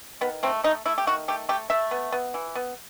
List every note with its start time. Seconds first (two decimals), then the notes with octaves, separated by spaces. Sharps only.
0.21 D#3 B3
0.43 A3 C4
0.64 A3 D#4
0.85 A3 E4
0.98 G4
1.07 D#3 F#4
1.28 A3 G4
1.49 A3 G4
1.70 A3 E5
1.91 B3
2.12 B3
2.34 E3
2.55 B3